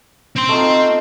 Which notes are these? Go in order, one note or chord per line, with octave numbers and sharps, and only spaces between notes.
C4 C6
A3 D#4 F4